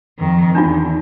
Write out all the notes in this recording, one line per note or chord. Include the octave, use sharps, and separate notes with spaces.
F2 D#3
E2 D4 D#4 F4